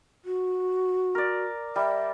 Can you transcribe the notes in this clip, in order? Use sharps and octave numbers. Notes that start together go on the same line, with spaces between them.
F#4
A#4 D5
G3 E5